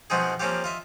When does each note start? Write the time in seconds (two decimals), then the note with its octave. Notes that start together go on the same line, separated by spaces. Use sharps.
0.10 B2 F3 B3 C4 D#4 G#4
0.40 F3 A#3 C4 C#4 F4 G4
0.64 F4 D#5 E5